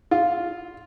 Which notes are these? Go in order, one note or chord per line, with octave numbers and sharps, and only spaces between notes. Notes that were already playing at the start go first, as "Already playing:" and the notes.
F4